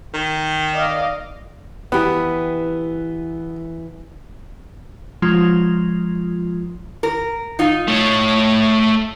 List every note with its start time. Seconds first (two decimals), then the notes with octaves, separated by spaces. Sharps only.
0.14 D#3
0.74 D5 D#5 F5
1.92 E3 B3 G4
5.22 F3 G#3 F4
7.03 A#4
7.59 D#4 F4
7.87 A3 C#5